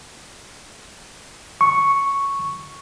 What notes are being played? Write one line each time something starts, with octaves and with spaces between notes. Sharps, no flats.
C#6